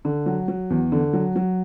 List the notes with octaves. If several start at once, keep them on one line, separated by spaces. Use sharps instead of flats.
D3
F#3
F#3
E2
D3
F#3
F#3